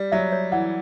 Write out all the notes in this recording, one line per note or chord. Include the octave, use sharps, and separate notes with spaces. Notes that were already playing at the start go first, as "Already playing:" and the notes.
Already playing: G3
F#3 E5
C#5
E3 F#5